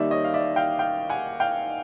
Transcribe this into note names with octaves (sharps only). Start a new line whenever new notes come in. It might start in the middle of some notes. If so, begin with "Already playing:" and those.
Already playing: D#2 D#3 G3 D5 E5
C#5 D#5
F5
D5 E5
F5 G5
F5 G5
F#5 G#5
F5 G5